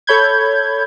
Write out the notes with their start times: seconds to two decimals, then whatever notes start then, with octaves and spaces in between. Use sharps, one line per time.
0.07 A4 C#5 B5 G6 G#6